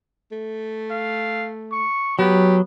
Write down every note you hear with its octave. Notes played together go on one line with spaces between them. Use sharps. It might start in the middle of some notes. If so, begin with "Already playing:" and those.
A3
F5
C#6
F#3 B3 G4